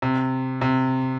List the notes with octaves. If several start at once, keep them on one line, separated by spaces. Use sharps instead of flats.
C3
C3